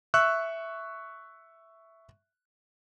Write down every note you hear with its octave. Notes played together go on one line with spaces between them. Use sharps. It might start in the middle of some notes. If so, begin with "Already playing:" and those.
E5 C#6 E6 F#6